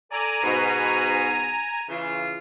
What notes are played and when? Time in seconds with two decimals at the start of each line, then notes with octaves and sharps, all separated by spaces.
0.12 A4 D5 G#5 A#5
0.43 G#2 B2
1.89 C#3 E3 F4